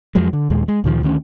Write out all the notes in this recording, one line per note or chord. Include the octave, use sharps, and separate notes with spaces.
F2 F3 F#3 G#3
D3
D#2 A#2 G#3
G#3
D2 A#2 D#3 F3
D2 D#3 C#4